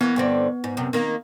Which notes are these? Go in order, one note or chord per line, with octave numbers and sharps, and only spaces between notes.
E3 A#3 B3
G2 D3 C4
G#2
F#2 C3
D#3 A#3